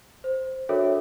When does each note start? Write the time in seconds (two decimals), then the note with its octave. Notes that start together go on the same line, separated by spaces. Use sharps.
0.24 C5
0.69 D4 F#4 A4 A#4 C#5 E5